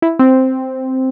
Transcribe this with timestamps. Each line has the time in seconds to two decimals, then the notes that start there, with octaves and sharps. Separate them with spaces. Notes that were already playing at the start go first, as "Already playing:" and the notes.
0.02 E4
0.19 C4